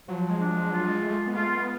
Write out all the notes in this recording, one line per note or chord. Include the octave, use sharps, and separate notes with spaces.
F3 F#3
G#3
D4
F#3
G#3
F#3 F4
G#3
G#3 A3
B3
A3 F4
B3